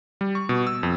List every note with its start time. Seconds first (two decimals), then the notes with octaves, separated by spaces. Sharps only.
0.21 G3
0.35 C#6
0.49 B2
0.67 E6
0.83 F2